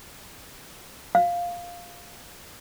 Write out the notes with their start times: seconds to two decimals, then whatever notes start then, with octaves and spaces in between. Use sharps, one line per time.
1.15 F5